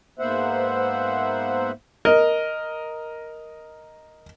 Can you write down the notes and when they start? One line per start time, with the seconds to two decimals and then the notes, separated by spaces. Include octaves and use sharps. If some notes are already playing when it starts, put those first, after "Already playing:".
0.19 G#2 A#3 B3 C5 E5 F#5
2.05 A#4 D#5